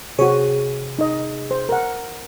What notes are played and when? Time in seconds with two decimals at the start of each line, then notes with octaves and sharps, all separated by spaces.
0.19 C3 F#4 G#4 C5 C#5
0.99 D#4 D#5
1.51 C5
1.69 A#4 F#5